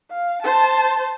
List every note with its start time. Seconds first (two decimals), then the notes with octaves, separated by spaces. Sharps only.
0.11 F5
0.42 C5 A5